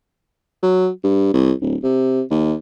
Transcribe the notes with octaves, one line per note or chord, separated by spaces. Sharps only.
F#3
G2
C2
D1
C3
D#2